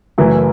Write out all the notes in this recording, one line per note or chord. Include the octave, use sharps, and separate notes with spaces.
F#1 F#2 E3 A3 E4